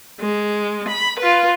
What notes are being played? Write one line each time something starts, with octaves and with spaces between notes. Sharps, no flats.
G#3
B5
F4 B4